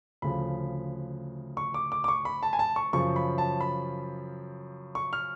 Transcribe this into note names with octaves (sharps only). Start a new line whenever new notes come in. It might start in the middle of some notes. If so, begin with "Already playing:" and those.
D2 C#3 F3 B5
C#6
D6
D6
D6
C#6
B5
A5
G#5
A5
C#6
F#2 C#3 F3 C#6
B5
A5
B5
C#6
F6